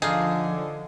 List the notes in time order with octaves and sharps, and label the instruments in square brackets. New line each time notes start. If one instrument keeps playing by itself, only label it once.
[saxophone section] D3 [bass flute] F3 [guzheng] D#4 F4 [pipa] G#4